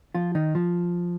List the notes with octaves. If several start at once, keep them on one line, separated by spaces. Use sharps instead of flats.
F3 F4
D#3 D#4
F3